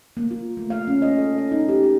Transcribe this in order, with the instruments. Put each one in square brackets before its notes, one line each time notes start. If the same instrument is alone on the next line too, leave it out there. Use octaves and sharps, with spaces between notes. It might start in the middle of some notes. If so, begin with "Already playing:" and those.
[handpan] A#3
F4
A3
F5
C#4
D#5
A4
D#5
D#4
G4
G4